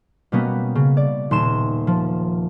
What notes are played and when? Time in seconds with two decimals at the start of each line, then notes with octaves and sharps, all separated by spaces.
0.32 B2 G3 A#3 B3 C#4
0.75 C#3
0.97 D5
1.31 D#1 C6 E7
1.87 F3